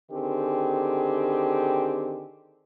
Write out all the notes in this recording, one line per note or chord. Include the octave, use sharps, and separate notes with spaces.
D3 D#3 C4 G4 G#4